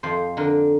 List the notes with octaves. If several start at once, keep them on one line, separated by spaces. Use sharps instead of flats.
F2 C5
D3 A#4